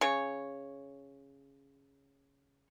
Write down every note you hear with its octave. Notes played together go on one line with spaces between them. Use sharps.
C#3 C#5